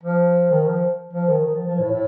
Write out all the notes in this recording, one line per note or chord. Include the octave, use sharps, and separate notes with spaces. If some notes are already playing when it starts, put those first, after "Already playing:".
F3
D#3
F3
F3
D#3
D#3
F3
F3
A2
A2